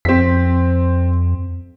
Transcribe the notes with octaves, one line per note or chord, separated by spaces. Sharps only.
F2 C4 B6